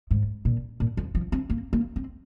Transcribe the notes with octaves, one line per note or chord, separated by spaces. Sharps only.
G#2
A#2
A#2
F2
F3
C4
A#3
A#3
C4